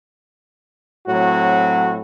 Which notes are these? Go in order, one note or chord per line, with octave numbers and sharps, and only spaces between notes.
A2 F#3 C4 F#4